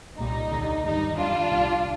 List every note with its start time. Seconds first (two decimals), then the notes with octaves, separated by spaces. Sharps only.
0.17 C2 A#2 G3 D#4
0.50 D#2 D3 G3
0.84 G2 D#3 G3 D#4
1.17 F2 D#3 G3 D4 F4
1.50 C2 A#2 G3